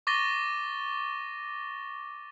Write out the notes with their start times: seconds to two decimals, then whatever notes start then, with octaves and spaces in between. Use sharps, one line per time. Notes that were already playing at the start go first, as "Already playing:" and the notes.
0.07 C#6 D6 A6 A#6 D#7 G7